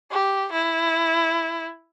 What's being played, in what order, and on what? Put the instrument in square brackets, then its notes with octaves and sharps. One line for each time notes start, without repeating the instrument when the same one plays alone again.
[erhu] G4
E4